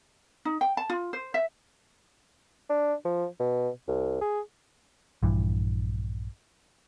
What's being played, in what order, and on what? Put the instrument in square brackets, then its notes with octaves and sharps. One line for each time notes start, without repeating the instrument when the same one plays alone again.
[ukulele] D#4
G5
A5
F4
C5
E5
[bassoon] D4
F3
B2
C2
G#4
[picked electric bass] A#1 G2 E3